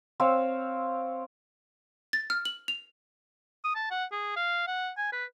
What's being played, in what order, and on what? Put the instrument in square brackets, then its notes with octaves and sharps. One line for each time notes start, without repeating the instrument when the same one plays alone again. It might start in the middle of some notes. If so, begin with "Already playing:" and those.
[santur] C4 C#5 F5 E6
[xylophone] A6
F6
F#7
F7
[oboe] D#6
A5
F#5
G#4
F5
F#5
G#5
B4